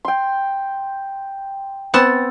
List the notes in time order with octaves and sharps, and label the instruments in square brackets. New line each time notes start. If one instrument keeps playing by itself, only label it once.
[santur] G5 C6
[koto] B3 A5 [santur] C4